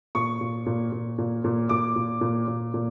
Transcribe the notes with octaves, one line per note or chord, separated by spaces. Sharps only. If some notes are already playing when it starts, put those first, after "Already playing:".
A#2 C#6
A#2
A#2
A#2
A#2
A#2
A#2 D6
A#2
A#2
A#2
A#2